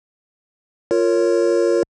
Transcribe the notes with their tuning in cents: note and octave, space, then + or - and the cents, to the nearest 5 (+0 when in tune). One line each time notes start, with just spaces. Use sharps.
F4 +0 A#4 -15 C#5 +0